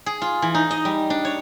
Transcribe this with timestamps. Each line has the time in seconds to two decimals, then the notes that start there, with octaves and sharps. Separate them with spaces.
0.06 G#4
0.22 F4
0.42 E3
0.54 D#4
0.71 D#5
0.85 G3
1.10 D4
1.25 C#5